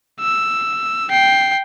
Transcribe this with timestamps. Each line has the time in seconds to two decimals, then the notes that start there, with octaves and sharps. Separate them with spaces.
0.21 E6
1.10 G5 C7